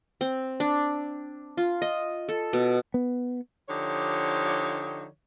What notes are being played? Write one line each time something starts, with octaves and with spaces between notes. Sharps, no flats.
C4
D4
F4
D#5
A4
B2
B3
D3 F3 D#4 G4 C#5